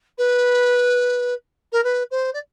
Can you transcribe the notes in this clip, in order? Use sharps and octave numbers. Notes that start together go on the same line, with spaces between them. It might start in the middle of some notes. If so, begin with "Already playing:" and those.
B4
A#4
B4
C5
D5